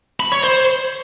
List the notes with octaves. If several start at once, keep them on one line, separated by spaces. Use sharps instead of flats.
B5
C#5
C5